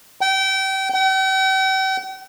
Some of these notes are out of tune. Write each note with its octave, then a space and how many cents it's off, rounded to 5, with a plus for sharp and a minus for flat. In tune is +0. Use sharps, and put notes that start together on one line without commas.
G5 -30
G5 -45